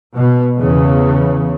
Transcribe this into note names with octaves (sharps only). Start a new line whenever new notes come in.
B2
E2 C#3